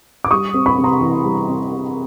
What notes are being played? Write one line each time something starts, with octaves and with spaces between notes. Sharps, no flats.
D6
G3 C#6 D#6
C4
B5 C#6
C3
A#5 C6
E3
G3
C4